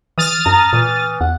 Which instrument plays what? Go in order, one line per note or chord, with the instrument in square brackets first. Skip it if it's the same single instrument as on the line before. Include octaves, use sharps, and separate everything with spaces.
[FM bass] E3 [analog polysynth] D#6 F6 A6
[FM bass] F#2 [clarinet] A#5
[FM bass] A#2 [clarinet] E3
[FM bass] E2 [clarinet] F#5